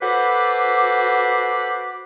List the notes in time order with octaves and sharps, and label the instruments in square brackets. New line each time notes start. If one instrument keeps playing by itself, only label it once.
[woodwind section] F#4 A4 B4 C5 B5 D6